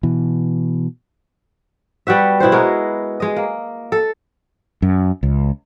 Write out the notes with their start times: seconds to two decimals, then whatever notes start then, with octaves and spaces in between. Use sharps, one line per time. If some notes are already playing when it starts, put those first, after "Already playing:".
0.03 B2 E3
2.07 G3 B3 F#4 E5
2.40 B2 E4 F#4 C5
2.52 G#3 B3 A#4
3.20 G#3 D#5
3.36 A#3
3.92 A4
4.82 F#2
5.23 C#2